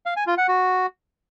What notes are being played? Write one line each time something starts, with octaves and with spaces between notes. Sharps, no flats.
F5
G#5
F4
F#5
F#4